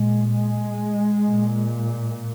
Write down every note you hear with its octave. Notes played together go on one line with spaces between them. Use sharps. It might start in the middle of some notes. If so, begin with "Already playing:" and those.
Already playing: A#2 G#3
G#3
A#2